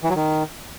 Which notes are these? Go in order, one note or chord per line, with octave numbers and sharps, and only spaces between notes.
E3
F#3
D#3